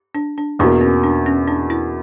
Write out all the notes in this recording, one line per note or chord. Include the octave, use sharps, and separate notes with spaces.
D4
D4
E2 B2 A#3 D4
C#4
D4
C#4
D4
E4